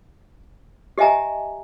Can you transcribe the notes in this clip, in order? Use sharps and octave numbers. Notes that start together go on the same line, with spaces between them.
G4 D#5 E5 G#5 A#5